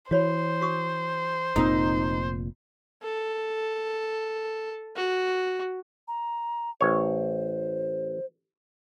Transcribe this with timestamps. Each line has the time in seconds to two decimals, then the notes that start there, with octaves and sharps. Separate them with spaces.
0.11 E3 F#4 C5 C#5 B5
0.61 F#4 C#6 D#6
1.56 F1 A#2 C4 D#4 D#6 E6
3.03 A4
4.96 F#4
6.08 A#5
6.81 A1 C5 C#5